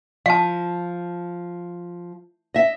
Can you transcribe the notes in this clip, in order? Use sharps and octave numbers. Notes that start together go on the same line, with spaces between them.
F3 F5 A5
D#5 E5